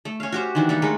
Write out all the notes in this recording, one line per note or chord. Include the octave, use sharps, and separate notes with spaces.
A3
C#4 F5
F#4 G4 C5
D#3 E3 D4
G3 A#3 F#5
G#3 A3 A#4